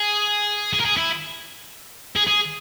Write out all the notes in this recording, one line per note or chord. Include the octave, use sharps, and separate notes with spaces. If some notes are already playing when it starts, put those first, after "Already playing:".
Already playing: G#4
G#4
A#4
G#4
E4
G#4
G#4